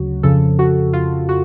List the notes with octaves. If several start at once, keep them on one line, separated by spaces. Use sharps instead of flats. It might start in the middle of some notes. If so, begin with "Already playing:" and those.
Already playing: D2 C#3 F#3 F#4
F2 C#3 F3 A4
F#4
F4
F#4